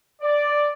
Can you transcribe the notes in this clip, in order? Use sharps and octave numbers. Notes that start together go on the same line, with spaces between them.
D5